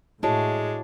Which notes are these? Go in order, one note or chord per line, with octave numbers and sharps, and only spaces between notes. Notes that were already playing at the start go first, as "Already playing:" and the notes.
A2 G#3 D4 E4 F#4 C#5